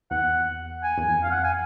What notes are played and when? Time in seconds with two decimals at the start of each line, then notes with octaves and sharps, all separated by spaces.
0.11 E2 F#5
0.83 G#5
0.98 E2
1.07 F2 G#5
1.23 F5
1.31 F#5
1.44 G#5